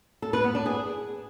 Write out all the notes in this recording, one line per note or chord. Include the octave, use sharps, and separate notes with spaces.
A4
B4
B3
D4
G#4